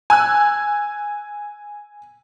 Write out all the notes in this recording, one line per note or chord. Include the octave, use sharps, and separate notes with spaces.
G#5 E6 F#6